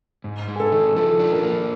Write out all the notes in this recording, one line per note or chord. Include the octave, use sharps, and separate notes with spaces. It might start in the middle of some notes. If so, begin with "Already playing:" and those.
G#2
G#3
G#4
A4
D#3
F3 A4
D4
A#4
A#3